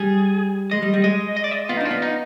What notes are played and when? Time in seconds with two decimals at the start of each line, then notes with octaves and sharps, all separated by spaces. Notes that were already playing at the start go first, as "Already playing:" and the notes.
Already playing: G3 G#4
0.71 G#3 D#5
0.82 G3
0.94 G3
1.04 G#3 D#5
1.37 D#5
1.44 D5
1.51 D#5
1.69 B3 F4
1.77 D#4
1.81 D4 F4
1.91 B3
2.02 D#4